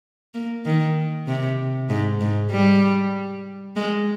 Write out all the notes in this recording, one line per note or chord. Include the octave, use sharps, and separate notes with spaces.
A#3
D#3
C3
G#2
G#2
G3
G#3